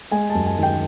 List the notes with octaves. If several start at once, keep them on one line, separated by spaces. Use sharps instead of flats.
G#3 G#5
A5
F#2
G#5
D#3
G5